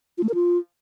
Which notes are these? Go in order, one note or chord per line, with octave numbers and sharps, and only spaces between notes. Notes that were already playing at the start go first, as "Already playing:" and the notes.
F4
A3
A#4
F4